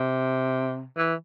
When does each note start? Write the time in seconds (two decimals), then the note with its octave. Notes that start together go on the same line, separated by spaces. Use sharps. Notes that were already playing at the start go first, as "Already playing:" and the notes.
Already playing: C3
0.97 E3